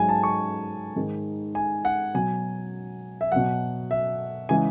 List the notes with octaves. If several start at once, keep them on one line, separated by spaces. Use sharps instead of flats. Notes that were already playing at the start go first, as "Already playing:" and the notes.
Already playing: G#2 F#3 G#5
A5
C#6
G#2 D#3 G#3
G#5
F#5
B2 F#3 G#5
E5
B2 F#3 F#5
E5
C#3 E3 G#3 G#5